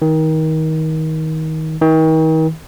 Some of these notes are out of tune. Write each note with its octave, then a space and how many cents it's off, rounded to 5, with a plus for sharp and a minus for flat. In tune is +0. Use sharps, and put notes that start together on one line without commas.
D#3 +25
D#3 +40